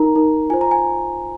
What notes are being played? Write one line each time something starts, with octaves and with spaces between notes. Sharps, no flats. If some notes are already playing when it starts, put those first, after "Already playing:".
Already playing: D#4 A#4 A#5
D#4 A#4
F4 C5 G#5
A#5
G#5